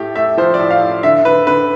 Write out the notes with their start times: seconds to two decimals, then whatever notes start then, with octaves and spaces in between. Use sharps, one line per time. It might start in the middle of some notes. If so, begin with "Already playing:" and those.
Already playing: A2 A3 G4
0.16 A3 E5
0.37 F3 C5
0.54 D5
0.59 A2
0.71 F5
0.81 A2
1.03 D3 E5
1.25 D3 B4
1.47 D3 B4